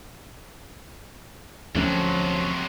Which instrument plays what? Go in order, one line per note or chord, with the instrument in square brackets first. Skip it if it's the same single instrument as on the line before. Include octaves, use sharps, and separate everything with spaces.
[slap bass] D2 A3 C#4 [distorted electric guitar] C3 F#3 [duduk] F3